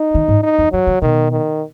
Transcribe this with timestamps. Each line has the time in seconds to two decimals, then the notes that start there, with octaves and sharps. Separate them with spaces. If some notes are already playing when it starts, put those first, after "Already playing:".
Already playing: D#4
0.15 D#3
0.28 G#2
0.43 D#4
0.59 E2
0.72 F#2 F#3
0.87 D#3
1.02 B2 D#3
1.32 D#3